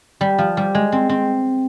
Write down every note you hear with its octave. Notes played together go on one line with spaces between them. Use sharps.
G3
F3
G3
G#3
C4
C4